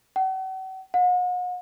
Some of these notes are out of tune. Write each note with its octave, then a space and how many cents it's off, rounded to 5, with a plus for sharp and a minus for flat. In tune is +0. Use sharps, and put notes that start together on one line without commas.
F#5 +45
F#5 -40